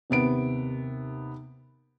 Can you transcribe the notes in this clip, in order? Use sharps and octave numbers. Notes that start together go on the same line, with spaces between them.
D#2 C3 B3 D7